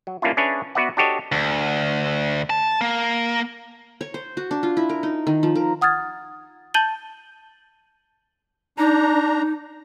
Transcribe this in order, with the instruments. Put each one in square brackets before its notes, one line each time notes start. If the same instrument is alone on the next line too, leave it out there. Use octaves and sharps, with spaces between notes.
[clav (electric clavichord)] F#3
G3 A#3 C#4 D4 E4 F4
C#4 D4 G#4 B4 C#5 E5
B3 F#4 B4 D5 E5 F#5
D4 F#4 G4 A4 C#5 D#5
[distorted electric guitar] D2
A5
A#3
[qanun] C#5
C5
F#4
D4
F4
E4
A#4
D#4
D#3
F3
A#4
[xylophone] F#5 D#6 F6 G#6 A6
A5 G6 A6 D#7 F#7 G7
[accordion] D4 A#5 [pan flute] D#4